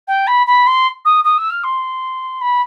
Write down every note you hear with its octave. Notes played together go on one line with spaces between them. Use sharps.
G5
B5
B5
C6
D#6
D#6
E6
F6
C6
B5